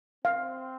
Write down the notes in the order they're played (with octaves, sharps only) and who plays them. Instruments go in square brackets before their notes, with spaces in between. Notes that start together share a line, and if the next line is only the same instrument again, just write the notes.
[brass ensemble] C4 [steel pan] F5